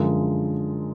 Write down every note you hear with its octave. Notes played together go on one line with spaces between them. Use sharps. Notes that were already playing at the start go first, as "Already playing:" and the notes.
Already playing: F#2 D3 F3 G#3